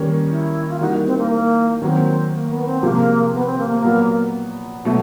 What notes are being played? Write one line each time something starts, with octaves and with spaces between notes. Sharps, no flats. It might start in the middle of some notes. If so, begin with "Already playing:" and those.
Already playing: D#3 G3 A#3 C#4
E4
F4
E3 G3 A#3 D#4 F#4
C4
A#3
A#3
D#3 F#3 A#3 C4
A#3
B3
C4
C3 F3 G#3 A#3
B3
C4
A#3
A#3
A#2 F#3 B3
B2 F#3 A3